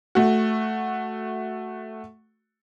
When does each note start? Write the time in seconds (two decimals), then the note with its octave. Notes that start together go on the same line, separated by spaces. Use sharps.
0.15 A3 F#4